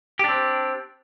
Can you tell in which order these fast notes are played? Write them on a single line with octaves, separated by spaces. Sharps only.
G4 D4 C4